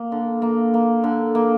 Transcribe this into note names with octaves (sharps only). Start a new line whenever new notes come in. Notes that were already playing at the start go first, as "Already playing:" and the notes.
Already playing: A#3
D3
A#3
A#3
D3
A#3